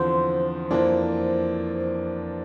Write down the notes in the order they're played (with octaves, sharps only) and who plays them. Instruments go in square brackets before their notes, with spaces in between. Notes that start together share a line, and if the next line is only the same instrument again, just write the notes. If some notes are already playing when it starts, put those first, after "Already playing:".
Already playing: [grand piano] E2 D3 F3 C4 [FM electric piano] C5
[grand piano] F2 E3 A#3 D4